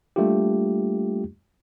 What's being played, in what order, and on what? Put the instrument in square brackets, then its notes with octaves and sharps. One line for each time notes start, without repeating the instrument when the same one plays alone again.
[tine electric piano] G3 A3 A#3 D4 F4 G4